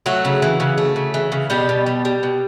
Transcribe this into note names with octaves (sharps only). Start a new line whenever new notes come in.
F#3 A3 F#4
C#3
E3
C#3
A3
C#3
E3
C#3
B2 G3 G4
B2
G3
G3
B2